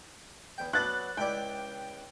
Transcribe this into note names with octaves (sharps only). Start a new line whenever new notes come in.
E2 G5
F#3 B3 D4 F#6 A6
C#2 E4 D5 G5